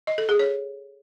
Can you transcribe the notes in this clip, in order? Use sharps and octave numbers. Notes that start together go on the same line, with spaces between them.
D#5
A4
G#4
C#5